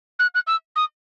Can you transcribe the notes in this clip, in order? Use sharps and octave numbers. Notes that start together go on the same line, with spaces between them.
F#6
F#6
E6
D#6